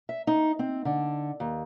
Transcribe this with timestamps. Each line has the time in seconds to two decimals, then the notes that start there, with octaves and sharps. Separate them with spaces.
0.09 E5
0.27 D#4
0.59 C4
0.85 D3
1.40 D#2